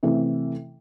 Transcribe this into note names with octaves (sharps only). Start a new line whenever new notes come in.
C3 E3 A3 E4